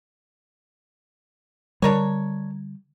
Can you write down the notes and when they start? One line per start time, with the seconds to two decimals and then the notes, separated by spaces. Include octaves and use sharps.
1.82 D3 G3 D4 A#4 C#5